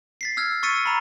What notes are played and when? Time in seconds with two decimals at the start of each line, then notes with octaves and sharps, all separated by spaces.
0.21 A6 B6 C7
0.37 E6 F6 G#6
0.63 C#6 E6 A6 B6 C#7 D#7
0.85 A#5 B5